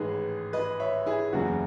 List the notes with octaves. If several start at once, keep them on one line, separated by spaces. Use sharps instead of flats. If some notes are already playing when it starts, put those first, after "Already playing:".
Already playing: A1 G#2 D#3 G#3 G#4 B4
B4 D#5
C#5 E5
E4 G#4
F#1 E2 C#3 F#3 F#4